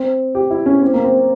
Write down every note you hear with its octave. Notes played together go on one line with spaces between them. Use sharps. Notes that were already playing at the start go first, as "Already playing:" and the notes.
Already playing: C4
G4
E4
C#4
C4
A#3
C4